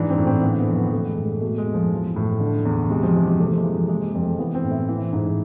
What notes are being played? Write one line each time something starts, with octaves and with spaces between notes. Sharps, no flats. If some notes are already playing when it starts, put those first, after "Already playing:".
Already playing: G#2 E3 D4
C4
A2
C4
D3 B3
B3
F2
B3
E3 A3
G#3
A2
A3
B2 A3
G#3
E2
F3
E3
A2
D3
E2
C3 G#3
F3
E3 G#3
F3
C3 A3
F3
G#3
E3
F3
E3 G#3
G#3
F2
A3
E3 B3
C4
A2
E4
E3
G#2